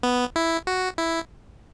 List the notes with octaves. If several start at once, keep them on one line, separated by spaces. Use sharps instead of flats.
B3
E4
F#4
E4